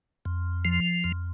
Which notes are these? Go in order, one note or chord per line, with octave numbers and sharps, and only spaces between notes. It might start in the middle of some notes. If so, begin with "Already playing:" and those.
F2
F3
F2